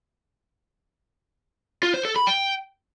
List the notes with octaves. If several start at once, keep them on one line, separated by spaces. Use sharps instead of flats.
F4
C5
A4
B5
G5